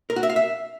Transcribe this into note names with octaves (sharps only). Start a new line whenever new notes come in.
A#4
F#4
E5
F5
E5